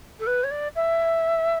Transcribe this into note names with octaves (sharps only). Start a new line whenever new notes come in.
A4
B4
C#5
D5
E5